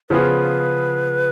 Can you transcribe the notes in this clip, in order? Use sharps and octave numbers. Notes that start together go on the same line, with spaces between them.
C#3 F3 B3 F4 G#4 B4